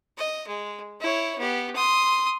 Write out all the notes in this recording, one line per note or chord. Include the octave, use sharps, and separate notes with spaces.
D#5
G#3
E4 C#5
B3 G4
C6 D#6